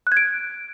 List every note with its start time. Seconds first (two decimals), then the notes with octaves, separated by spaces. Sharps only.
0.07 F#6
0.12 G#6
0.17 D7